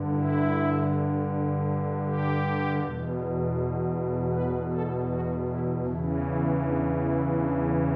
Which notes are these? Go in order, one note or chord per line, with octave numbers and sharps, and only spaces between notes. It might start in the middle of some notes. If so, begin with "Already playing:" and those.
Already playing: G2 D3
E4
G4
E2 B2
B4
A4
F#4
E4
E2 C#3 E3 E4
E4
D4
E4
D4